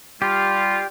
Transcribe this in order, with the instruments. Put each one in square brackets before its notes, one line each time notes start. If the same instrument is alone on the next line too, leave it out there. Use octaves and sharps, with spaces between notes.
[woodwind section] G3 F4 [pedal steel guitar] G4